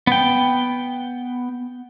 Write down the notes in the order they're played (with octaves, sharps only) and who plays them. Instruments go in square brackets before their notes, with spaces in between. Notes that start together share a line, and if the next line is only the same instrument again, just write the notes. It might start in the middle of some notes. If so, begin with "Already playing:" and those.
[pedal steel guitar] B3 G5